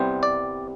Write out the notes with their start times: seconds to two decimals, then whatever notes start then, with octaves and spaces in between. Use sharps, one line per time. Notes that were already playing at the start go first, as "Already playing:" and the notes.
Already playing: C2 C3 G3 B3 C5
0.23 D5